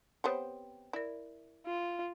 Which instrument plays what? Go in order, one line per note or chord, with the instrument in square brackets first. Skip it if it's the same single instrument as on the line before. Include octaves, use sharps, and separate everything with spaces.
[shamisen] B3 C4 G4 [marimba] C5 C#5
[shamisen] E4 [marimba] A#4 D5
[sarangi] F4